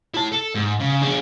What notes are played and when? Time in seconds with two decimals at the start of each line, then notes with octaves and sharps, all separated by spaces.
0.14 E4 A5
0.32 A4
0.55 G#2
0.80 C#3
1.02 D4 G#4